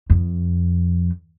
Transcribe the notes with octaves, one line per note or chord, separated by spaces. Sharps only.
F2